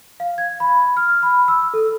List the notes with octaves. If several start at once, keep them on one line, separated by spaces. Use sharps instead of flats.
F5
G#6
B5
F6
B5
E6
A4